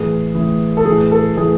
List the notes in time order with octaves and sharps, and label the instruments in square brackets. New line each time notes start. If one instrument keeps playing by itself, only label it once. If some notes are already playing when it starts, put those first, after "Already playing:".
Already playing: [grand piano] A2 E3 G#4
A2 E3
A4
A2 E3 G#4
A4
A2 E3 G#4